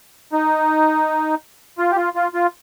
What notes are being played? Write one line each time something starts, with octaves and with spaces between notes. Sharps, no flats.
D#4
F4
G4
F4
F4
F4